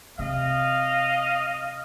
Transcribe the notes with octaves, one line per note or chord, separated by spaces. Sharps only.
C3 D#5 F5